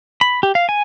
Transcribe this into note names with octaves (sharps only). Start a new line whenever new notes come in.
B5
G4
F5
G#5